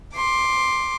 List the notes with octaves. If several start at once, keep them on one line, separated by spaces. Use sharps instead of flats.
C6 D6